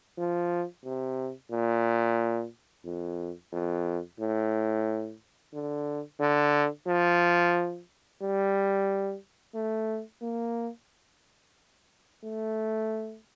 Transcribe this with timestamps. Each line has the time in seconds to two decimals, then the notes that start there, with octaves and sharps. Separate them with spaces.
0.18 F3
0.84 C3
1.51 A#2
2.85 F2
3.52 F2
4.19 A2
5.54 D3
6.20 D3
6.87 F3
8.22 G3
9.55 A3
10.21 A#3
12.24 A3